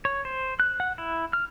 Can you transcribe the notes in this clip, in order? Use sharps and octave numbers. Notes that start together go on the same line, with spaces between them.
C#5
C5
F#6
F#5
E4
F6